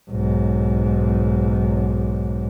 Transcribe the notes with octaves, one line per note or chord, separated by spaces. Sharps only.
B1 G#2